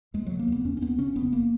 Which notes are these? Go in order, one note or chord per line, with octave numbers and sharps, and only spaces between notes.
D#2 G#3
C#3 F#3
A#3
D#2 B3
D#2 C#4
C#4
D#2 B3
C#3 C#4
F1 B3
A#3